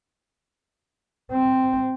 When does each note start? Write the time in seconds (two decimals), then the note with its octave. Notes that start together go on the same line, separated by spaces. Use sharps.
1.32 C4